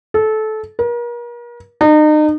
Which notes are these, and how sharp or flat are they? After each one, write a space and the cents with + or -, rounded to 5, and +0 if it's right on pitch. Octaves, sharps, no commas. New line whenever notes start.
A4 -20
A#4 +40
D#4 -35